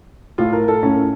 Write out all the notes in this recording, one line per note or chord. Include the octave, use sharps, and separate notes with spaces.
A2 F4
A#4
A4
A2 C#4